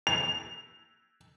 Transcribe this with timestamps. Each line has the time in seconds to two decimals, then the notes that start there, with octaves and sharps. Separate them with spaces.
0.07 F7